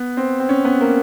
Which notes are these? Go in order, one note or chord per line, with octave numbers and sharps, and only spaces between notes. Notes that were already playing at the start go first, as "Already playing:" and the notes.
Already playing: B3
C4
C4
C#4
B3
A#3